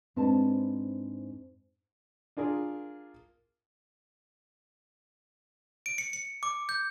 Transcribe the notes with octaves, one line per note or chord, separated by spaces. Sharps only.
G#2 C4 D4 B4 A5
D4 F4 G#4 A#4
D7
C#7
C#7
D6
G6